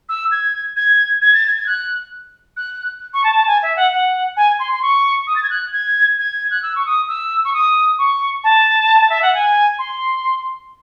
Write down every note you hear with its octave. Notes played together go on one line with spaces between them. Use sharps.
E6
G#6
G#6
G#6
A6
G#6
G#6
F#6
F#6
C#6
A5
A5
G#5
E5
F#5
F#5
G#5
C6
C6
C#6
D#6
A6
G#6
F#6
G#6
G#6
F#6
E6
C#6
D#6
E6
C#6
D#6
C#6
A5
E5
F#5
G#5
C6